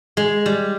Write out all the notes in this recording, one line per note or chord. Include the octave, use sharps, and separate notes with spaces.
G#3
G3